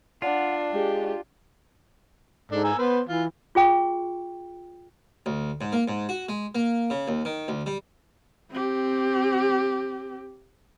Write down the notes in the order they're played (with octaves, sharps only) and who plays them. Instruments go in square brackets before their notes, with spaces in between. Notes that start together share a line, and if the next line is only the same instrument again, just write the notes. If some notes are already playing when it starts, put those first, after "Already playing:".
[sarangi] D4 [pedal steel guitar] F4 [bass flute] F#5
[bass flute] G#3 [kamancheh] G4
[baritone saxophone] G#2 [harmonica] D4 A4
[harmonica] G#5 A#5 E6
[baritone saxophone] B3 [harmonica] B4 C5
[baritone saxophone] E3 [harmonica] F4
[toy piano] F4 G#4 G5 C#6
[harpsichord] D2
G#2
A#3
G#2
F#4
G#3
A#3
C#3
D#2
D#3
D2
G3
[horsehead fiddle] C4 G4